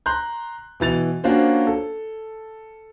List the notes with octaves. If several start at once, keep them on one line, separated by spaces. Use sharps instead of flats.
A#5 C6 F#6 G6
B2 E3 A6 F7
A#3 C#4 D4 F4 F#4 C5
A4